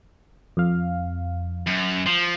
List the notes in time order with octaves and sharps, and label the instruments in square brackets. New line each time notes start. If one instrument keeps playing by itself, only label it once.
[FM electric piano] F2 F5
[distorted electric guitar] F#2
[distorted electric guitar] F3 [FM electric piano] C6